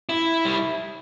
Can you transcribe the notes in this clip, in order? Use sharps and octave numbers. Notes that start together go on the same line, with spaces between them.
E4
G3